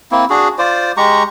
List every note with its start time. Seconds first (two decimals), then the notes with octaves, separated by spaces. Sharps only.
0.12 A#3 C4 E4
0.30 D4 F#4 G#4
0.59 F4 C5 D5
0.97 G#3 G4 A#5 C#6